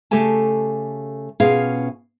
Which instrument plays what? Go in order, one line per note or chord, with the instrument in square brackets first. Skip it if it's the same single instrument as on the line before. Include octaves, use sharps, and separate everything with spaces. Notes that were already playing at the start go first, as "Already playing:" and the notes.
[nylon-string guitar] C#3 A3 G4 A4 G#5 A5
B2 C#4 F4 G#4 F5